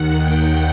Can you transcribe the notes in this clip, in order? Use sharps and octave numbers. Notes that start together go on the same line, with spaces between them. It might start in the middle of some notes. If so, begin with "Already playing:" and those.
Already playing: D#2 D#3 F#5
G5